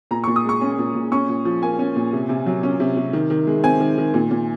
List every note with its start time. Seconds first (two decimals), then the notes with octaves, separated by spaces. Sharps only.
0.11 A#2 A#5
0.24 C#6
0.27 A#2
0.36 D#6
0.45 G#3 C#6
0.61 C#4
0.78 A#2
0.95 A#2
1.12 C#4 C#6
1.29 A#2
1.45 F3
1.62 A#3 G#5
1.79 C#4
1.96 A#2
2.13 C3
2.29 C3
2.46 F#3
2.63 C#4
2.80 C3
2.97 C3
3.13 D#3
3.30 D#3
3.47 G#3
3.64 C4 G#5
3.80 D#3
3.98 D#3
4.14 A#2
4.31 A#2